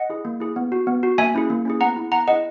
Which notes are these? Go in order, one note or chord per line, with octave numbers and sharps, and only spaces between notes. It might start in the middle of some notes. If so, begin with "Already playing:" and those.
Already playing: D#5 F#5
E4 G#4
A#3
E4 G#4
B3
F#4
B3
F#4
A#3 E5 G#5
C#4 E4 G#4
A#3
C#4 E4 G#4
B3 F#5 A#5
E4 G#4
B3 F#5 A#5
E4 G#4 D#5 F#5